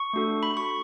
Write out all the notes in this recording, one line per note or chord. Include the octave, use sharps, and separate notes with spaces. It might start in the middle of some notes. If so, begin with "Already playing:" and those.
Already playing: C#6
A3 D4 F#4 A4
B5
C#6